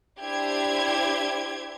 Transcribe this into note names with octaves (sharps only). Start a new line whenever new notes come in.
D4 E4 G4 C5 G#6